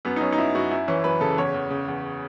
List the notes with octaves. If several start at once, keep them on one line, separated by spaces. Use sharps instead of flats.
F#2 B3
D#4
F#2 C#4
D#4
F#2 E4
F#2 F#4
F#2 E4
E3 C#4
F#2 B4
C#3 A4
E2 C#5
E2
C#3
E2